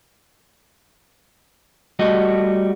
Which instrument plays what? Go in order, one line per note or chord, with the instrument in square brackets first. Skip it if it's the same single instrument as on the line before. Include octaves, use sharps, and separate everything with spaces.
[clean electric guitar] G3 A3 F#4 D#5